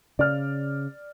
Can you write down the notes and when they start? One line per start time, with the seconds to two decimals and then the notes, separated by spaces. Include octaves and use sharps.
0.19 C#3 D5 F6